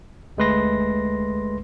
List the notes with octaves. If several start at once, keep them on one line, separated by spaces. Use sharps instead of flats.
D2 G#3 A3 B4 C6 A#6